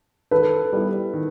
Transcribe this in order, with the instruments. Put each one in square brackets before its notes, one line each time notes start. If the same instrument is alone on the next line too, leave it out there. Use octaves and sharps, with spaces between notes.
[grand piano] D#3 [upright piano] A4 B4
[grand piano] G3 B3 E4
D#3